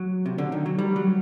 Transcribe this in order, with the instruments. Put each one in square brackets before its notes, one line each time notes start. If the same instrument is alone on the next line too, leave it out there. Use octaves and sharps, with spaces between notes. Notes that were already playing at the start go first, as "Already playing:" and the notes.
Already playing: [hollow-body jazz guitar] F#3
C3
D3
D#3
F#3
G3
F#3